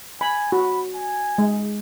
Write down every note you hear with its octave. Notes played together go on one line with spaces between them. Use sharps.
G#5 B5
F#4 B5
G#5
G#3